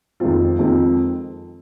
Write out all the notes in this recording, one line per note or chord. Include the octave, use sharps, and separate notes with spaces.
F2 D#3 G#3 C4 F4
F2 D#3 G#3 C4 F4